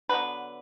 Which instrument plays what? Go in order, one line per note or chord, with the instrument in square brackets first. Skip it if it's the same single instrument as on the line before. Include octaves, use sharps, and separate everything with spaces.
[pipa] D3 F#3 B3 B4